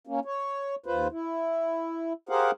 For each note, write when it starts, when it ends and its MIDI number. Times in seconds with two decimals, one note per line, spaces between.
0.07 0.20 58
0.07 0.20 61
0.25 0.75 73
0.86 1.08 39
0.86 1.08 65
0.86 1.08 71
0.86 1.08 72
1.11 2.13 64
2.29 2.51 67
2.29 2.51 68
2.29 2.51 70
2.29 2.51 72
2.29 2.51 77
2.29 2.51 78